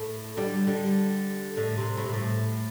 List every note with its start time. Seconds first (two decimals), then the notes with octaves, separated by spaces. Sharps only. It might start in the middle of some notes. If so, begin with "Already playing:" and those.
Already playing: A2
0.37 D3 G3
0.67 D3 G3
1.57 A2 D3
1.77 C3
1.97 A2
2.06 C3
2.14 A2